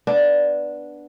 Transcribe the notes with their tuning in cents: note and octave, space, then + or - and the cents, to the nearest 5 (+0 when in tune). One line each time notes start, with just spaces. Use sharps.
B3 -10 D4 +0